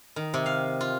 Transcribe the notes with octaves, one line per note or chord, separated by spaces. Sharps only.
D#3
C3
F5
F4